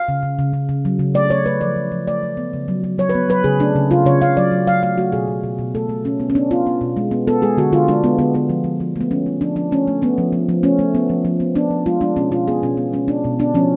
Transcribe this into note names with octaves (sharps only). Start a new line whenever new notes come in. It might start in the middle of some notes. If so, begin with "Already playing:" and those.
Already playing: F5
C#3
C#3
C#3
C#3
C#3
F#3
C#3
A3 D5
A3 C#5
A3 B4
F3 D5
F3
F3
A3 D5
A3
B3
C#3
F#3
F#3
F#3 C#5
B4
B3
F#3 B4
C#3 G#4
A3 D4
C#3
C#3 F4
C#3 C#5
C#3 F5
F#3 D5
F#3
F#3 F5
A3 F5
A3 F#4
B2 G#4
B2
B2
B2
A3 A4
A3
B2 C#4
B3
C#4
B3 D4
B3 F4
B3
B2
G#3
B3
B3 A4
G#3 G#4
D3 F#4
D3 F4
G#3 D4
G#3 B3
D3 B3
D3 B3
F3
F3
F3
A3 B3
F3 C#4
A3
F3 D4
F3 D4
A3 C#4
A3
A3 B3
F3
F3
F3
A3 C#4
A3
B3
F3
F3
B3
B3 D4
F3
G#3 F4
G#3 D4
B2 C#4
B2 F4
B3 G#4
B2 C#4
B3
G#3 C#4
B3 D4
B2
B3 D4
F3 C#4